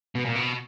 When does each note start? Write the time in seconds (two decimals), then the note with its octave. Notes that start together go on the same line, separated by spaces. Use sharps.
0.15 B2
0.25 A#2
0.35 B2